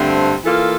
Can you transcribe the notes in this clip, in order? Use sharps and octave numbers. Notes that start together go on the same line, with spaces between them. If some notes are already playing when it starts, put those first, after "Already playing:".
Already playing: G2 D3 A3 C4
E3 A#3 F4 A4